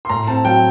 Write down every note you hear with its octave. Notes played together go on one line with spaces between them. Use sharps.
C6
A2 A#5
C4 A5
F#3 G5